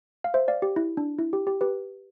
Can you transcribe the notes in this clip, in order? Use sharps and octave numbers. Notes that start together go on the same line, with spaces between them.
F5
C5 E5
D5 F5
G4
E4
D4
E4
G4
G4
G4 B4